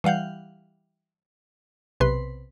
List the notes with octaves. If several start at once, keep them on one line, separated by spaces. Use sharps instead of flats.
E3 G3 F5 F#5 G6
B1 C3 B4 C6